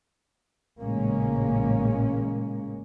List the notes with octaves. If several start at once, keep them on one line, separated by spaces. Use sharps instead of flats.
A1 A#2 C#3 G#3 A#3 C#4